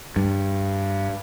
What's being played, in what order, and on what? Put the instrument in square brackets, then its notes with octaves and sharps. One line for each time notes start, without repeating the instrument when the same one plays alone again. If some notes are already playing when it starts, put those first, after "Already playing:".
[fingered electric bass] G2